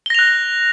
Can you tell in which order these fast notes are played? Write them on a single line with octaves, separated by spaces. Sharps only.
G7 A#6 F7 F#6